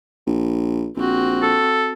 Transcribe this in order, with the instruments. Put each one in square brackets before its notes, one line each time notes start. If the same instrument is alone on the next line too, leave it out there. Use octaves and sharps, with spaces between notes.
[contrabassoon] A#1
[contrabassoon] A#1 [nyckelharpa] C4 F#4
[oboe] A4